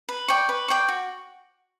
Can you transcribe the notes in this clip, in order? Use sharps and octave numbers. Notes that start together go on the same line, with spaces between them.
B4
D5 G5 C#6
B4
D5 G5 C#6
F#4